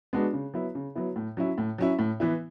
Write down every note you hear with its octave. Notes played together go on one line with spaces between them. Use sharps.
G#3 B3 D4 F#4
C#3
F#3 B3 E4
C#3
F#3 B3 E4
A2
F#3 C#4 E4
A2
F#3 C#4 E4
A2
E3 B3 E4